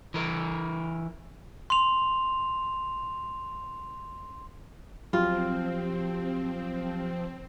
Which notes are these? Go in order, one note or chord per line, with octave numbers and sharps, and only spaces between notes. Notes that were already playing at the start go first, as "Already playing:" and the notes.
E3 A#4
C6 F7
F3 F#3 C4 F4 G4